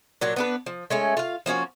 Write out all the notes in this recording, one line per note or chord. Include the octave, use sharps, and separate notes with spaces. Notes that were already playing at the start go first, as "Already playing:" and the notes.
A#2 F#3 D4
B3 D4 B4
F3
G#3 A3 C#4
F4 F5
F3 A#3 C#4 F#4